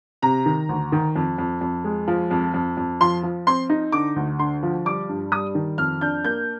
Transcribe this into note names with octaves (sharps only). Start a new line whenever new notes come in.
C3 A#5
D#3
D2
D#3
F2
F2
F2
G#3
F3
F2
F2
F2
F3 C6
F3
C4 C6
D#4
D3 D6
D2
D3 C6
F3
G3 D6
G2
G3 D#6
D#3
F2 F6
D4 G6
A#3 G6